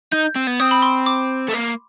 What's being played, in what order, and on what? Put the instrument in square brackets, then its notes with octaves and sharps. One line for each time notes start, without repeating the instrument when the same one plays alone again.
[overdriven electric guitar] D#4 [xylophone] G6
[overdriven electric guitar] C4
B3
[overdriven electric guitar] C4 [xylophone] D#6
[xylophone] B5
C6
D6
[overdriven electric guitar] A3
A#3